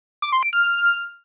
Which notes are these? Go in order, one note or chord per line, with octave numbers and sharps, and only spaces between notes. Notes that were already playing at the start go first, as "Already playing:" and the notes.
D6
C6
D7
F6